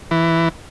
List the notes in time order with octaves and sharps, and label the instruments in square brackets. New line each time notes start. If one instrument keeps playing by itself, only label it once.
[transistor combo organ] E3